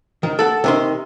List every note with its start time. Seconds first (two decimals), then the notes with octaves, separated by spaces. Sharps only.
0.23 D#3
0.39 A4 F#5
0.64 C3 D#3 C6